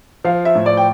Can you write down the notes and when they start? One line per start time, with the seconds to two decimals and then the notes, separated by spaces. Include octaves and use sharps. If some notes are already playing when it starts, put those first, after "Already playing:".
0.24 F3 F5
0.45 E5
0.55 A2
0.66 D5
0.77 G5